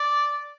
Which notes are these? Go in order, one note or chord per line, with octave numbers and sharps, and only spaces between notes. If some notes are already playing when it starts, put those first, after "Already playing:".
Already playing: D5